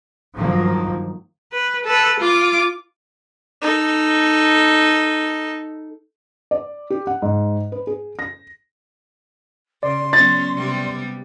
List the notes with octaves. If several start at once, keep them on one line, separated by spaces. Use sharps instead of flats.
G2 D#3 F3 F#3 A#3
B4
A4 B4
F4 D6
D#4 A4
D5
G4
F#5
G#2
B4
G#4
A#6
C#3 D5 C6
F#3 B3 C#4 A6
C3 G3 B3